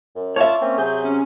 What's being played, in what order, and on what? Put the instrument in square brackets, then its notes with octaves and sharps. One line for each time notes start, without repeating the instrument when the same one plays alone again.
[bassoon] F#2
[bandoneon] F4 D5 A5 [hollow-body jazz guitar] C#5 E5
[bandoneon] A#3 C#4 [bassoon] C4
[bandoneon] C3 F#3 [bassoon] G#4 [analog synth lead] G6
[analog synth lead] C#4